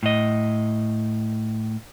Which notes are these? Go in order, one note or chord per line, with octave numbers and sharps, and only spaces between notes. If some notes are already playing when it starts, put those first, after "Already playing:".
A2 D#5